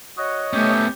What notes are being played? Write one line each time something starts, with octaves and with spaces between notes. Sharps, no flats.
F#4 C#5 D#5
A3 B3 C#4 G4